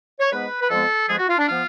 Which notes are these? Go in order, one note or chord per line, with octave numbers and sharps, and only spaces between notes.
C#5
G#2 G#3 B3 B4
B4
F2 F3 G#3 B3 A4
F2 F3 G#3 B3 G#4
F#4
F4
D4
F3 B3 F4